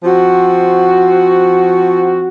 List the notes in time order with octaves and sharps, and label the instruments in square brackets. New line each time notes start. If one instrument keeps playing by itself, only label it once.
[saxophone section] F3 C4 F#4